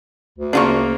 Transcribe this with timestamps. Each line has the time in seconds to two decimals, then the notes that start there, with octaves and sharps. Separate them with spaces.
0.38 D2
0.53 C#3 A#3 D4 F4 C#6